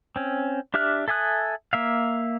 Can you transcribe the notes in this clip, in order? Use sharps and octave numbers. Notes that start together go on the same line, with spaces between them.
C4 C#4
D4 G4 E5 F6 F#6
A4 E5 G#5 D#6 F#6
A#3 E5 F5